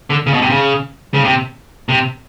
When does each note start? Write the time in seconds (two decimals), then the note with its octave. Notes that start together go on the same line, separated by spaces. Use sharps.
0.10 D3
0.27 C#3
0.34 B2
0.42 C3
0.50 C#3
1.14 C#3
1.24 C3
1.89 C3